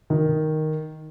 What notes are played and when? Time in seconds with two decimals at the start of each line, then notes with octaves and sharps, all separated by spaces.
0.10 D#3